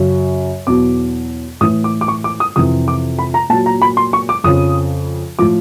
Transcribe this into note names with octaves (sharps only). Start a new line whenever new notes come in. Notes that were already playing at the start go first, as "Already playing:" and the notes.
Already playing: F#2 C#3 F#3
E2 B2 F#3 D6
A2 E3 D#6
D6
D6
C#6
D6
D#6
F2 C3 E3 D#6
D6
B5
A#5
A#2 F#3 A5
A#5
B5
C6
C#6
D6
F2 C#3 F3 D#6
A2 F3 D6